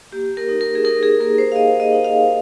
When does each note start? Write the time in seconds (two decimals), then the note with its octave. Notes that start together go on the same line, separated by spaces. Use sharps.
0.12 A#3 G4
0.37 A#4
0.49 D#4
0.61 A#4
0.75 G#4
0.84 D#4 A#4
1.03 G#4
1.20 A#3 A#4
1.38 C5
1.52 F5
1.56 A#3 D#5
1.80 D#5
1.92 D#4
2.05 F5